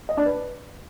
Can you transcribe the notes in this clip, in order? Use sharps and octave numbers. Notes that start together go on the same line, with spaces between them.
D#5
D4
B4